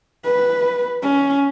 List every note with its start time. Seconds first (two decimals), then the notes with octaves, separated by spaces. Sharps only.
0.24 B4
1.02 C#4